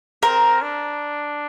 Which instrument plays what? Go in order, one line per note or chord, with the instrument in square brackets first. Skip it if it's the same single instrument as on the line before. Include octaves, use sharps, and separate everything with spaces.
[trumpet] C4 [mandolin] A#4
[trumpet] D4